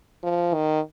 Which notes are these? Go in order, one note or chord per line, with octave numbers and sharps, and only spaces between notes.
F3
D#3